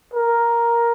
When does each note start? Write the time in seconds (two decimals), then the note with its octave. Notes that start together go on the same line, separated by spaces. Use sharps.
0.14 A#4